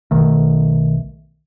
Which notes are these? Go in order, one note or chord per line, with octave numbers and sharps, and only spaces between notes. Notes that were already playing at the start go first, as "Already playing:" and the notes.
B1 D#3 A3